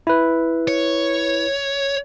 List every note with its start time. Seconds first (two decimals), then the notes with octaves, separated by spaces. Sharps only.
0.07 E4 B4
0.68 C#5